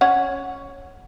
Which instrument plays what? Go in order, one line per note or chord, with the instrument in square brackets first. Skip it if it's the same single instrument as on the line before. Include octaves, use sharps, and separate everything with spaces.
[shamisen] C#4 C#5 F#5